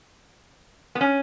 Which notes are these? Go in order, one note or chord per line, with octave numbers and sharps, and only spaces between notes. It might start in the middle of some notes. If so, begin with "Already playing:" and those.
B3
C#4